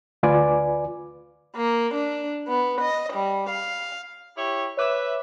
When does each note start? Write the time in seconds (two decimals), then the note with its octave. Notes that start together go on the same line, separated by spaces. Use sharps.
0.23 D2 F4 B4 D5 G#5 D6
1.56 A#3
1.95 D4
2.46 B3
2.82 D#5
3.13 G3
3.50 F5
4.36 E4 G4 C#5
4.77 B4 C#5 E5 D6 E7